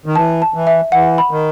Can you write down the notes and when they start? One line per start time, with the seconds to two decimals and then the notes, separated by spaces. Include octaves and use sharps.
0.06 D#3
0.16 E3 A5
0.42 A5
0.54 E3
0.67 E5
0.92 E3 F#5
1.18 B5
1.31 D#3